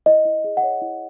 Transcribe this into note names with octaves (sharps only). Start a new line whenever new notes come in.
E4 D#5
E4
G#4
F#5
C#5
E4